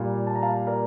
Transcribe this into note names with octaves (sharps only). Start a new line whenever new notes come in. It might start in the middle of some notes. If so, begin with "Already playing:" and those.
Already playing: A#2 G3 A#3 F5
A5
A#5
F5 A5
A#4 D5